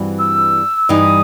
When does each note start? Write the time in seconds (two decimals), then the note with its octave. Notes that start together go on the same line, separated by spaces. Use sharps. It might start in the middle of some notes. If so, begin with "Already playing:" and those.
Already playing: G2 E3 G3 C4 F#4
0.19 E6
0.89 G2 E3 G3 D#4 D#6